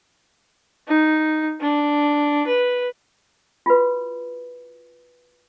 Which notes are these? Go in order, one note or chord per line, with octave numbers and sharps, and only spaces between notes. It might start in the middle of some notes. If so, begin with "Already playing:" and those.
D#4
D4
B4
F4 F#4 B4